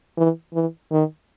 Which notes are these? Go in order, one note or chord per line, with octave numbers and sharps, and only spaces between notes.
E3
E3
D#3